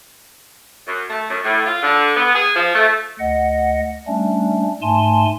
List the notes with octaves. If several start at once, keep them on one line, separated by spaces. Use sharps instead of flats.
F#2
A3
F#2
A2
F4
D3
B3
G#4
F3
A3
D2 D#5 F#5
G3 A3 C#4 D4
G#2 A3 G#5 A5 C6